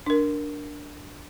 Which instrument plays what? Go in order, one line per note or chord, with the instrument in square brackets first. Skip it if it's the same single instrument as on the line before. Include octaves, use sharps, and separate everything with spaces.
[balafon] D4 A#4